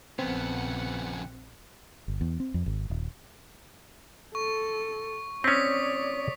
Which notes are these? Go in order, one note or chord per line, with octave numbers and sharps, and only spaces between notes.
A#1 F2 C#3 B3 C4 F#5
G1
E2
C4
F2
G#1
D#1
A4 C#6
C4 C#4 C#5 D5 D#6 B6